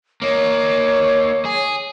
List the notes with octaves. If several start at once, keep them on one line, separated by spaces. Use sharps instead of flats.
A#3 D#4 C#5
G#4